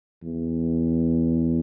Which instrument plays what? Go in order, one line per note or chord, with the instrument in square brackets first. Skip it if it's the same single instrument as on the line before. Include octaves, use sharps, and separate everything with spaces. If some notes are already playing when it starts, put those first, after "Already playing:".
[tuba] E2